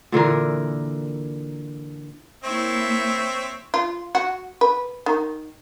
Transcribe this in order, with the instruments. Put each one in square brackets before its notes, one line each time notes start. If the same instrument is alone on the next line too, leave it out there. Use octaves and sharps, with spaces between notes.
[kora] A#2 D3 E3 A#4
[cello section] A#3 E4 [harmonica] C4 C#5 E5
[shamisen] F4
F#4
B4
D#3